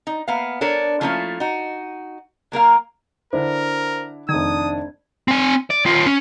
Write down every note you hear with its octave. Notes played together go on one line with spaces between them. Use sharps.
D#4
A#3 B3 E5 F5
D4 A4 A#4 C#5
F3 A3 A#3 C#4 E4 F4
D#4 F#4
F#3 A#3 A#4 F5
D3 D4 E4 A#4 C5
F1 D#3 D4 D#6 G#6
C4 G#5
D5
D#3 F4
C#4